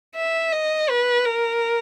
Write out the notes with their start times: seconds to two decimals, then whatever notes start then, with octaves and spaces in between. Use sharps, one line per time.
0.16 E5
0.52 D#5
0.89 B4
1.25 A#4